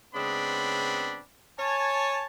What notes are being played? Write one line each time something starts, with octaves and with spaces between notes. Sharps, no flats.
C#3 G#3 B3 C4 D4 B5
C#5 G#5 A5